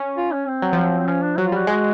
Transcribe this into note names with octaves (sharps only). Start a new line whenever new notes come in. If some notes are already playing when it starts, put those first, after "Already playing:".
Already playing: C#4
F4
C#4
C4
F#3
F3
F#3
C4
F3 C#4
D4
F#3 F#4
F4
G3 F#4
G#3 F#4